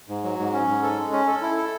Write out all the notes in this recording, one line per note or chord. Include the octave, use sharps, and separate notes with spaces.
G#2
F#3
G#2
C#4
G#2
A4
G#3
C#4
A4
E4
A4